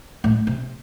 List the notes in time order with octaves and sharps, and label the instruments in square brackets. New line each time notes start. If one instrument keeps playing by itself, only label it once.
[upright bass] A2
C3